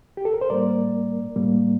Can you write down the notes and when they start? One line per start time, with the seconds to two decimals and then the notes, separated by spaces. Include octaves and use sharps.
0.17 G4
0.25 A4
0.34 A#4
0.41 C5
0.50 A2 G3 A#3 A#4 D5
1.36 A2 G3 A#3